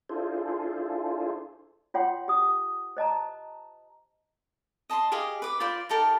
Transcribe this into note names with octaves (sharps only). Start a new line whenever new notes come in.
D4 E4 F4 G#4 A4 C5
F4 C#5 F#5 G5 C6
G4 D#6
C5 D#5 A5 A#5
D#5 A5 B5 C6
G4 G#4 D#5 F5
B4 D6
F4 C5 D5 B5
D#4 G4 A4 A#4